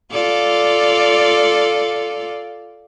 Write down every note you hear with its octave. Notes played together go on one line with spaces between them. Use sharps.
F4 A4 D5